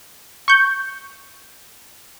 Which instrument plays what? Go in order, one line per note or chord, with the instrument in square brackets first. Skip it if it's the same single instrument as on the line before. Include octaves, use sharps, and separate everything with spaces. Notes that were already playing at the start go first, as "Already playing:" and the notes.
[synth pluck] C#6 G6